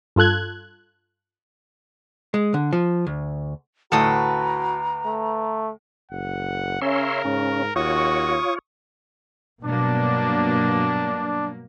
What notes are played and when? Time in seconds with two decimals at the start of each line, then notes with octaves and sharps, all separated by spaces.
0.16 G2 F4 A4 F#6 G#6
2.34 G#3
2.54 D3
2.73 F3
3.07 D2
3.92 D2 A2 F#4 A4 B4 A#5 D#6
5.05 A3
6.11 F#1 F#5
6.82 C#3 C#4 A#4 C#5 E5 C6
7.25 G#2 C#4
7.76 D#2 F4 F#4 C#5 C#6 D#6
9.63 G2 B2 F#3 A#3 D4